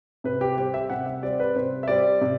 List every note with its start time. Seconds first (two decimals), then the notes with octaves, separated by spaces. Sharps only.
0.24 C3 B4
0.41 G4
0.58 G3 C4 G4
0.74 E5
0.90 C3 F#5
1.06 E5
1.23 G3 C4 D5
1.40 B4
1.56 C3 C5
1.83 E5
1.88 G3 C4 D5
2.21 C3